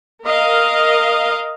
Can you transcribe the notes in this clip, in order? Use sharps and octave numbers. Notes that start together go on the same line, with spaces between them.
A#4 D#5 F5